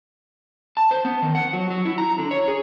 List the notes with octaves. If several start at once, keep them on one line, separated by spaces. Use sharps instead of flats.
A5
C5
B3
D#3
F#5
F#3
F#3
E4
A#5
D3
C#5
G#4